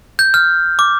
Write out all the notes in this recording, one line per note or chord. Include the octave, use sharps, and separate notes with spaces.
G6
F6
D6